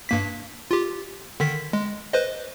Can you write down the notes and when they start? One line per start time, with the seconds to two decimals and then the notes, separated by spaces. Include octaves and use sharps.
0.09 G2 A#3 B6
0.71 F4 G4
1.40 D3 D#3 B6
1.73 G#3
2.13 B4 C5 D#5